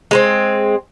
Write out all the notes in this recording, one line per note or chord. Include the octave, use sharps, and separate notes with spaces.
G#3 B3 C4